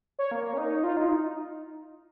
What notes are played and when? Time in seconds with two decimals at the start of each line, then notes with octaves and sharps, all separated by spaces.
0.19 C#5
0.31 A#3
0.53 C#4
0.58 D#4
0.84 F4
0.97 D#4
1.05 F4
1.09 D#4